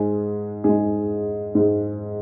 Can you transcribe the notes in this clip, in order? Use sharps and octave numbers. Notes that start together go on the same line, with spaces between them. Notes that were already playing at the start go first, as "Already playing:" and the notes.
Already playing: G#2 G#3 G#4
G#2 G#3 G#4
G#2 G#3